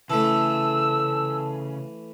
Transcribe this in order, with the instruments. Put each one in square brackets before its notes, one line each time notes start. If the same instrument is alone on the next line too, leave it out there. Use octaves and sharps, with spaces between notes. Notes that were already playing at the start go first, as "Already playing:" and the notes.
[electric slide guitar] C#3 [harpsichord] E3 A3 [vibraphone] A5 [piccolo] E6